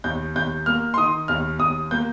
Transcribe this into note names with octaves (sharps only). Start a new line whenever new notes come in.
D#2 G6
D#2 G6
A#3 F6
C6
D#3 D#6
D#2 F6
D#2 D#6
A#3 G6